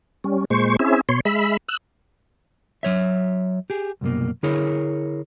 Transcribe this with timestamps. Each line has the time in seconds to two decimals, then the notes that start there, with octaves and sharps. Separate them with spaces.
0.24 G3 C#4
0.50 A#2 G#3 C5 C#6
0.79 C4 C#4 E4 G#4 E5
1.09 B2 C#5 C6
1.25 G#3 E5 B5
1.68 E6 F#6
2.83 F#3 C#5 E5
3.70 G4 G#4
4.01 C2 F#2 B2 A#3
4.43 D3 E4 G#4 A#4 C#5